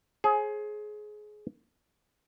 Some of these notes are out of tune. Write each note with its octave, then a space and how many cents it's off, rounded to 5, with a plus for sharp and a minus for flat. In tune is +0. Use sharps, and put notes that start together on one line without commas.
G#4 +20 C5 +45